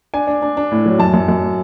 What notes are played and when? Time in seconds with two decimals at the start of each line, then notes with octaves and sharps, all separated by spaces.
0.14 D4 G#5
0.27 D4
0.42 D4
0.57 D4
0.71 A2
0.86 F#3
0.99 F#2 A5
1.14 F#2
1.28 F#2